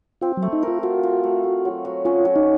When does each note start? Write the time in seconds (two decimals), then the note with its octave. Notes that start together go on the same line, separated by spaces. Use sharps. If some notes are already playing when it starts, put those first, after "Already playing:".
0.21 C4 F4
0.37 F#3
0.42 A3
0.53 D#4
0.63 A#4
0.68 F4
0.83 F4 F#4
1.03 F4
1.24 A3
1.44 A3
1.65 F#3
1.85 F#3
2.05 C#4 F4
2.25 F#3
2.36 D#4